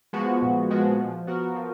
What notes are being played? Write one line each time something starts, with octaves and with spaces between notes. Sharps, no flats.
F3 G#3 B3 F#4
A#2
F3 G#3 B3 F#4
F3
B3 F#4 A#4
F3